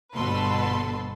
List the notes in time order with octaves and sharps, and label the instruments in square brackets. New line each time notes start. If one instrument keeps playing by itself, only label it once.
[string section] G1 B2 A4 B4 C6